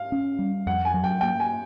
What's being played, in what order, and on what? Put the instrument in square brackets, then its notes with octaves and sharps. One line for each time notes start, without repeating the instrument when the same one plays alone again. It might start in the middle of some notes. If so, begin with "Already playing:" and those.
Already playing: [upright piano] F5
[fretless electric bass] C#4
G3
[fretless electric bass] F2 [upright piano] F#5
[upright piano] G#5
[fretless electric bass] F#3
[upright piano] G5
[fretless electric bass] A#3 [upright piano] G5
[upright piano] G#5